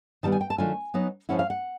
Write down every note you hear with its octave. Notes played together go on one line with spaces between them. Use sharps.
D#3 G3 B3 E4 A5
G#5
G5
A5
D#3 F#3 A3 D4 F4 G#5
F#3 B3 D#4
F3 G#3 C#4 E4 F#5
F5
F#5